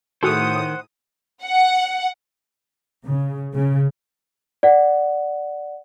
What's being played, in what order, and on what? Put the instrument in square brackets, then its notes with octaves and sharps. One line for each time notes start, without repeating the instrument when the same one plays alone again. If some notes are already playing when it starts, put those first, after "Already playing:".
[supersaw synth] A2 D#6 [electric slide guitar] D#3 [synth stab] F#4 G#4 A4 [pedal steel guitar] C5 F#5
[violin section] F#5
[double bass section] C#3
C#3
[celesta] D5 F#5